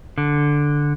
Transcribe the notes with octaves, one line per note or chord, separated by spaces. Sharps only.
D3